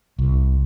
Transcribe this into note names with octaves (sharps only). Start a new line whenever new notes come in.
C2